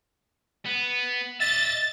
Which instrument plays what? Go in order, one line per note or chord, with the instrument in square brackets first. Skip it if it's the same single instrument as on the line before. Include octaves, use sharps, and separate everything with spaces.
[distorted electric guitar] B3
[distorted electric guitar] D#5 E5 [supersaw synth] A6